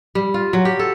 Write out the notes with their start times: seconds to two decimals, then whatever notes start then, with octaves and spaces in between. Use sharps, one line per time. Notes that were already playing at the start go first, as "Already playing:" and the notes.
0.15 G3
0.34 F4
0.53 F#3
0.65 G4
0.79 A4